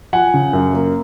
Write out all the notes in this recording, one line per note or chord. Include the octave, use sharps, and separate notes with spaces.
F3 F#5 G#5
C#3
F#2
A#3